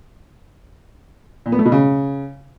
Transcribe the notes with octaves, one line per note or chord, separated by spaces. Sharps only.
A#2
B3
A3
B2
C#3